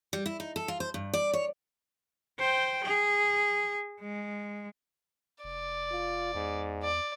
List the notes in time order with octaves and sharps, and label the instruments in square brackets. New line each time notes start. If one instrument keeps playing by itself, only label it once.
[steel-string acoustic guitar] G3
E4
D#4
A4
F4
C5
G2
D5
C#5
[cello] C5 G5
G#4
G#3
[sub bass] F1 [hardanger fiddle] D5
[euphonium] F4
[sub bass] E2 [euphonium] G#2
[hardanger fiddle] D5